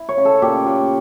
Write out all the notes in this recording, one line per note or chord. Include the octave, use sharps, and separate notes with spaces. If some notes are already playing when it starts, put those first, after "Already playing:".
Already playing: E4
C#5
C#3
A4
A#2 G4
A#2